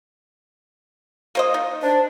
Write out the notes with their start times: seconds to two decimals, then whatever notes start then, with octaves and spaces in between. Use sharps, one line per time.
1.35 A#3 C5 D#5
1.54 D#4
1.82 D4 C5